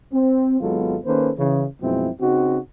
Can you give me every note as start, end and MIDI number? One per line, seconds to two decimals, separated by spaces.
0.12 0.60 60
0.61 0.96 32
0.61 0.96 54
0.61 0.96 56
0.61 0.96 59
0.61 0.96 65
0.61 0.96 69
1.05 1.30 51
1.05 1.30 58
1.05 1.30 61
1.05 1.30 69
1.05 1.30 71
1.05 1.30 72
1.37 1.64 49
1.37 1.64 52
1.81 2.08 42
1.81 2.08 47
1.81 2.08 53
1.81 2.08 56
1.81 2.08 60
1.81 2.08 64
2.20 2.57 49
2.20 2.57 60
2.20 2.57 63
2.20 2.57 66